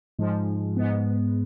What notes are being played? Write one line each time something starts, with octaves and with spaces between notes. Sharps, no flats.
G#2 F3 G#3
G#2 G#3 B3